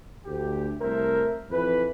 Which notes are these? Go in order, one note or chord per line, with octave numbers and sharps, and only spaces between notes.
D2 G4
C2 A3 A#4 C5 E5
F2 E3 B4